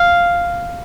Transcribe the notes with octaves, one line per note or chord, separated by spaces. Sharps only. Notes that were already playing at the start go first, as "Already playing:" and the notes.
Already playing: F5